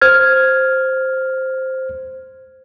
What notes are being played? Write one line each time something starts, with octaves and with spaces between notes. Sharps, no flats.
C5 F6 G#6